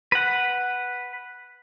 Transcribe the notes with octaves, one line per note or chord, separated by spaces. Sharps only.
B4 F#5